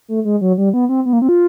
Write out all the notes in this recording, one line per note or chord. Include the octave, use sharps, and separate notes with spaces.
A3
G#3
F#3
G3
B3
C4
B3
A#3
C4
F4